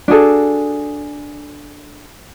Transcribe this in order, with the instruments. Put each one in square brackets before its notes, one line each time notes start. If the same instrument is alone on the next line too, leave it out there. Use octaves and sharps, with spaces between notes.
[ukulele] D4 F#4 G#4 A4